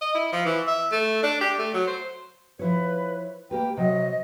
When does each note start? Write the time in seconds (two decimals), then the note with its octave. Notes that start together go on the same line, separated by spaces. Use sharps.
0.01 D#5
0.15 E4
0.32 F3
0.45 E3
0.67 E5
0.92 A3
1.23 D4
1.41 G4
1.59 A3
1.74 F#3
1.87 C5
2.59 F3 E4 B4 C#5
3.51 A#3 G4 B4 G5
3.77 C3 F#3 D#5